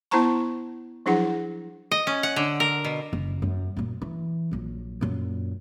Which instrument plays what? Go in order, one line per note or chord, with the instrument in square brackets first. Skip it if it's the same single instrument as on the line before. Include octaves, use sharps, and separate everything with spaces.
[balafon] B3 E4 C5 A5 A#5 C#6
F3 F#3 D4 E4 G#4 F#5
[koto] D#5
C#4
F#5
D3
A#4
B2
[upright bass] F#1
F#2
F#2 A#2
E3
A#1 F#3
F#2 A#2